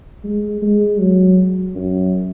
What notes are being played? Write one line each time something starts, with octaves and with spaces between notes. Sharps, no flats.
G#3
G#3
F#3
F#2